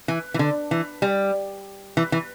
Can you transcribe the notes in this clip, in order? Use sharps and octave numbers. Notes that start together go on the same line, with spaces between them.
E3
E3
D3
E3
G3
E3
E3